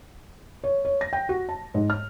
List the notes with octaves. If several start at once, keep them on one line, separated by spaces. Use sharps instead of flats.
C#5
C#5
A#6
G5
F#4
A5
G#2
F6